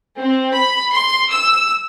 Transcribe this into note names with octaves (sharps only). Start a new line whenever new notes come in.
C4
B5
C6
E6